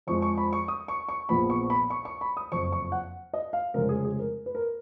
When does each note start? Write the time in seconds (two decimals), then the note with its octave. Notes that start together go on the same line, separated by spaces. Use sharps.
0.07 F2 F3 G#3 C#6
0.22 C#6
0.38 B5
0.53 C#6
0.68 D#6
0.88 C#6
1.09 C#6
1.29 A#1 A#2 F3 B3 B5
1.50 C#6
1.70 B5
1.90 C#6
2.05 C#6
2.21 B5
2.37 D#6
2.51 F#1 F2 F3 C#6
2.72 C#6
2.92 F#5
3.33 D#5
3.53 F5
3.74 F1 F2 C#3 G#3 A#4
3.89 G#4
4.05 G#4
4.19 A#4
4.46 B4
4.55 A#4